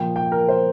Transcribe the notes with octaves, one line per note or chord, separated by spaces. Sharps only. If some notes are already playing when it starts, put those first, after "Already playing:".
Already playing: A#2 F3 A#3 G5
G5
A#4
C5